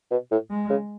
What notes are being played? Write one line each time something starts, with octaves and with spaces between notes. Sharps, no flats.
B2
A2
G#3
C#3